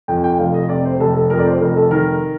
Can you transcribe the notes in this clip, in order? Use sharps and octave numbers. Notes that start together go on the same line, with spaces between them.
F2 G5
G5
F1 F5
D#5
C3 D5
C5
G4
F1 A4
A4
F2 A#4
D5
C5
F1 A#4
A4
D#3 A#4